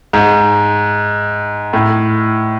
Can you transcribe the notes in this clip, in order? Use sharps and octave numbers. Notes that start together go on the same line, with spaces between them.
G#2
A2